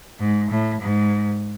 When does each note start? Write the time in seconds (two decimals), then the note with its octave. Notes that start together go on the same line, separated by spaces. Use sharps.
0.20 G#2
0.50 A2
0.81 G#2